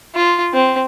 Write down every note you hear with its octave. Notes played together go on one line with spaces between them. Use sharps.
F4
C4